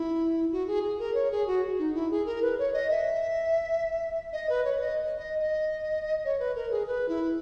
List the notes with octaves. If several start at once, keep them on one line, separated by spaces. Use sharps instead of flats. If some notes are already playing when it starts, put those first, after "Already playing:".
Already playing: E4
F#4
G#4
G#4
A#4
C#5
G#4
F#4
D#4
E4
G#4
A#4
B4
C#5
D#5
E5
D#5
B4
C#5
D#5
D#5
D#5
C#5
B4
A#4
G#4
B4
E4